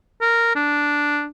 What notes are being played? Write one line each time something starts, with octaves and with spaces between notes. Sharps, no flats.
A#4
D4